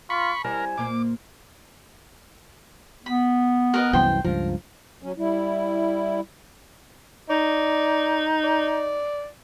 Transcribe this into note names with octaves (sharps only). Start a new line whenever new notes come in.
F4 B5 C#6
G3 C4 E4 A#4 G#5
A#2 A#3 C5 D6
B3 B5
A#4 B4 D#5
C2 F#2 E3 C5 G5
C#2 G2 F3 A#4
F#3 C#4
G3 E4
D#4 D5
D5